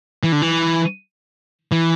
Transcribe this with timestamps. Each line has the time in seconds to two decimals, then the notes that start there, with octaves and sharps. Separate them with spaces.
0.23 E3
0.32 D3
0.42 E3
1.72 E3